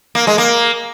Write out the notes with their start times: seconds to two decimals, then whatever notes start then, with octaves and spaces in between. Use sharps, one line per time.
0.15 A#3
0.27 G#3
0.38 A#3